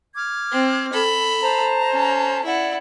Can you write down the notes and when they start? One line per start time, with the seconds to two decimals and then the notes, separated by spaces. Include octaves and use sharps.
0.15 D6 F6 G#6
0.52 C4
0.93 A4 B5
1.42 C5 A5 A#5
1.93 C#4
2.45 E4 D5 F#5